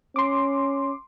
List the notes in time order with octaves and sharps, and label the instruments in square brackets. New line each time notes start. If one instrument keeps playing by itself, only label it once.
[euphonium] C#4 [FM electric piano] C6 D6